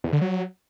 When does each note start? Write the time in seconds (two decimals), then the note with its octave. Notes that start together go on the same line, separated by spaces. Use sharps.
0.04 E2
0.13 D3
0.21 F#3